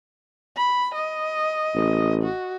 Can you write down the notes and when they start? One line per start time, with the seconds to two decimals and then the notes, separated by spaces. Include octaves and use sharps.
0.56 B5
0.95 D#5
1.75 A1
2.23 F#4